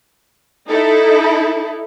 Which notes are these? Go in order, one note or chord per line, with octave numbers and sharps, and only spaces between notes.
D#4 E4 A4